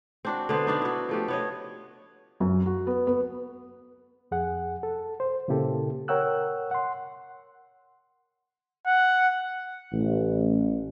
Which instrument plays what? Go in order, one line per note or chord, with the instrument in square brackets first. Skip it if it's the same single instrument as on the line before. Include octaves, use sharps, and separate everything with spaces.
[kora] C4 D4 F#4
D3 B3 B4 C5
B3 D4 D#4
E4 F#4
F3 A3 G4
B3 C#5 D#5
[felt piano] F#2
F#4
B3
B3
[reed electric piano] F2 G#4 F#5
A4
C5
A#2 C#3 A#3 E4 G4 A4
A#4 C#5 F#5 G5 E6 F#6
F#5 C6
[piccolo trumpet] F#5
[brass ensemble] A1